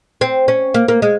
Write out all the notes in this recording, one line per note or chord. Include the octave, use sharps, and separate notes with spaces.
C4
C#4
A#3
A#3
G#3